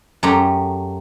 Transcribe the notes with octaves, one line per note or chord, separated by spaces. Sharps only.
F#2 A3 G4 A#5 C6